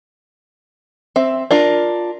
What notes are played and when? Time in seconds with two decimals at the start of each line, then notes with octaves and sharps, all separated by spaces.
1.16 C4 E5
1.51 D4 F4 A#4